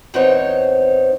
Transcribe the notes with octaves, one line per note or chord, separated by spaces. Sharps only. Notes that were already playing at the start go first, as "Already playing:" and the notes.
E2 C4 D#4 C5 C#5